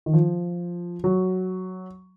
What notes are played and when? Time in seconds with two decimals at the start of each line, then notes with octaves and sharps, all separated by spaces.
0.06 D#3
0.13 F3
1.04 F#3